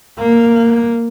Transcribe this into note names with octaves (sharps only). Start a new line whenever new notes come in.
A#3